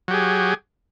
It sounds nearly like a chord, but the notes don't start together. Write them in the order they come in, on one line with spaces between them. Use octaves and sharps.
F#3 G4 G#4